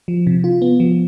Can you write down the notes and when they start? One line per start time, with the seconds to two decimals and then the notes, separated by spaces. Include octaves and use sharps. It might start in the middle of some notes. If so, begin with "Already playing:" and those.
0.08 F3
0.27 C3
0.44 F4
0.62 B3
0.80 F3